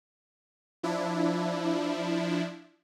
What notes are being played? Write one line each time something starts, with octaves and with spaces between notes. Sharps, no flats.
F3 D4 E4